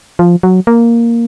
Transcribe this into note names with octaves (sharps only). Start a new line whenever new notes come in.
F3
F#3
A#3